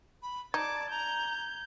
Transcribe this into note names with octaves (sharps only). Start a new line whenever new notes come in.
B5
D#4 D5 A5 D6 G#6
A#5 G6